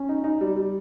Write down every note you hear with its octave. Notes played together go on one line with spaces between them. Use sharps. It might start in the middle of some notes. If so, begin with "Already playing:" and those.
Already playing: C#4
D#4
D#4
G3
G3